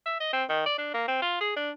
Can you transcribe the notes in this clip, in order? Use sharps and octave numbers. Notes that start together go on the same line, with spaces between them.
E5
D#5
C4
D#3
D5
D4
A#3
C4
F4
G#4
D4